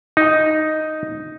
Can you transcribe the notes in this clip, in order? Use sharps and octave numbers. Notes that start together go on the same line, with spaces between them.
D#4